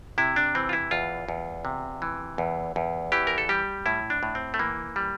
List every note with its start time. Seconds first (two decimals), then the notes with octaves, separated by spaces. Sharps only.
0.18 C3 E4
0.36 D4
0.55 E3 C4
0.69 F4
0.73 E4
0.91 E2 F4
1.29 E2
1.65 C3
2.02 E3
2.38 E2
2.76 E2
3.12 E3 G4
3.27 A#4
3.38 A4
3.49 G3 G4
3.86 A2 E4
4.10 D4
4.23 A2
4.35 C4
4.54 A3
4.59 E3 A#3
4.96 G3